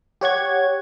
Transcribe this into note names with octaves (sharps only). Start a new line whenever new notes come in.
G4 C#5 F#5 G#6